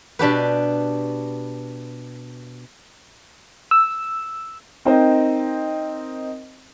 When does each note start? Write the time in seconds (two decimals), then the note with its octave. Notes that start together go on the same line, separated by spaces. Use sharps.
0.19 B2 D4 G4 B4
3.71 E6
4.85 C4 D#4 A#4 C5 D#5 G5